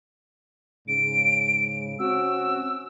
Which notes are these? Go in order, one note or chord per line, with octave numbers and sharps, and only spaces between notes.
G#2 C#3 D7
C4 C#4 F#4 E6